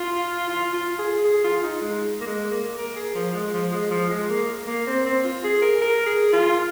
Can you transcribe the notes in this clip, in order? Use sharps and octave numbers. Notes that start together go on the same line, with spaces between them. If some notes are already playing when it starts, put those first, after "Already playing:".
Already playing: F4
F4
F4
G#4
G#4
F4
D#4
G#3
A#3
G#3
A#3
A#4
G#4
F3
G#3
F3
G#3
F3
G#3
A#3
A#3
C4
C4
F4
G#4
A#4
A#4
G#4
F4